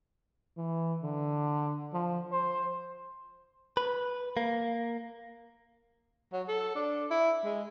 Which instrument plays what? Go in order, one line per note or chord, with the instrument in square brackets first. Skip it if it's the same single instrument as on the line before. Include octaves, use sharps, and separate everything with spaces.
[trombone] E3
D3
F3
C5
[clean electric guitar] B4
A#3
[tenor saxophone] F#3
A4
D4
E4
G#3